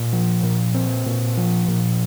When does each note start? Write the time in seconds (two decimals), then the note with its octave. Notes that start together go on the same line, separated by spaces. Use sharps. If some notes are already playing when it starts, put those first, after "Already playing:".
Already playing: A#2
0.13 F3
0.43 A#2
0.74 C4
1.06 A#2
1.37 F3
1.68 A#2